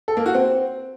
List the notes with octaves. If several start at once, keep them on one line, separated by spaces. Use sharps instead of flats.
A4
A#3
F#4
C4